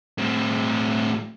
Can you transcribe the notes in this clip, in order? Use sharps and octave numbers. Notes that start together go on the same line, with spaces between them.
A2 C4